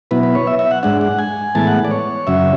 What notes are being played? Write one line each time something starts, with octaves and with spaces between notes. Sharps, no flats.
B2 F#3 B3 E4 B4
B4
C#5
E5
E5
F#5
G#2 G#3 D4 F#5
F#5
G#5
A2 E3 G#3 B3 A5
F#5
D5
C#5
F#2 C#3 F#3 C#4 E5